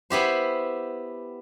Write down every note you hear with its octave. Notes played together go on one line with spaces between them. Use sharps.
B3 E4 G4 C5